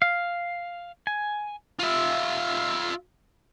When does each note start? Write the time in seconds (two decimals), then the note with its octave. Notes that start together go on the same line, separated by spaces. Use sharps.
0.02 F5
1.07 G#5
1.80 F4 E5